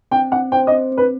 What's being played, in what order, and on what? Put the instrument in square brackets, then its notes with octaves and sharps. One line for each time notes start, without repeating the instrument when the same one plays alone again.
[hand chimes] C4 [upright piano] G5
[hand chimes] C4 [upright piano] F#5
[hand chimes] C5 [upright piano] G5
[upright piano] D#5
[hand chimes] C4
C4
[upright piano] B4